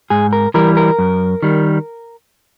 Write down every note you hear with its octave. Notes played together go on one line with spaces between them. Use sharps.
G#2 G#4
A#4
E3 G3 A#4
A#4
F#2
D#3 G3